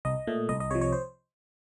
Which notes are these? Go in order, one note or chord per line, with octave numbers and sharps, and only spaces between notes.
C2 D#5
A#2 A3
C2 D#5
D#5
C3 F3 C#5
C#5
C5